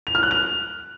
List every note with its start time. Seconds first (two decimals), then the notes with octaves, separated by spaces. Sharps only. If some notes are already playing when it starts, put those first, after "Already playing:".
0.07 F7
0.15 F6
0.23 F#6
0.31 F7